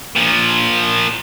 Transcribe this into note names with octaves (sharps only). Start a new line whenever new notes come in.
A#2 F3